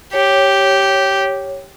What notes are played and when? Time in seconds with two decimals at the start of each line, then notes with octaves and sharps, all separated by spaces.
0.13 G4 C#5